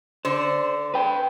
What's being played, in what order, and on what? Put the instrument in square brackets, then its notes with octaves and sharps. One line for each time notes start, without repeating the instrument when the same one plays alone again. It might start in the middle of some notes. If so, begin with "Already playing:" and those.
[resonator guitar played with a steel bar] D3 [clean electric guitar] C5
[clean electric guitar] B4 G5